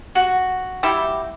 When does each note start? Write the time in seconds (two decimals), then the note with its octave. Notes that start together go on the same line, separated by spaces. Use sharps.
0.15 F#4
0.83 G3 E4 G4